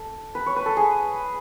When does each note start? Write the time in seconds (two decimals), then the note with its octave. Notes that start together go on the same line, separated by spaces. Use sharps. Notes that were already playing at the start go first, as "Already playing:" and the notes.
Already playing: A4
0.35 B4
0.46 C#5
0.56 B4
0.66 A4
0.77 G#4